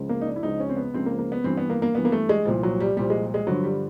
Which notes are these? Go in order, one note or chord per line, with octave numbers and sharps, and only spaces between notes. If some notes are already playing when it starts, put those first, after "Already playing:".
Already playing: C#2 C#3 F3
A#3
D#4
D4
E4
C#2 C#3 F3 D#4
C#4
C4
B3
C#2 C#3 F3 C4
A#3
A#3
B3
G2 E3 C4
B3
A#3
A#3
G2 E3 B3
A#3
A3
G#3
C2 A#2 F3
F#3
G3
C2 A#2 F3 G3
G#3
G#3
G2 D3 F3 F#3
G3